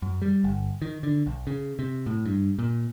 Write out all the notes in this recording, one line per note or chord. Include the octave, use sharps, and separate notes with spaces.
F#2
G3
G1
D#3
D3
B1
C#3
C3
A2
G2
A#2